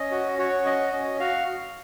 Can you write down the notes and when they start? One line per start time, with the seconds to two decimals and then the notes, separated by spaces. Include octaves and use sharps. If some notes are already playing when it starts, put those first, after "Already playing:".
Already playing: C#4 D#5
0.11 F#4
0.38 F#4 C#5
0.66 C#4 D#5
0.93 C#4 D#5
1.20 F#4 F5